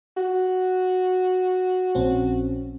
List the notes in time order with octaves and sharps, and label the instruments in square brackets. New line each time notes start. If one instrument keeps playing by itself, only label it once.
[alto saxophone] F#4
[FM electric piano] A#1 C4 C#4